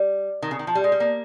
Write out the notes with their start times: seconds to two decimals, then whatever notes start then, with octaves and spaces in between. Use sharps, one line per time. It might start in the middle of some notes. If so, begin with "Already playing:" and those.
Already playing: G3
0.42 D#3
0.51 C#3
0.59 D#3
0.67 F3
0.75 G3
0.84 G#3
0.92 G3
1.00 A#3